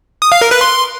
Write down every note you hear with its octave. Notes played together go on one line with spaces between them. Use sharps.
D#6
F5
A#4
B4
C6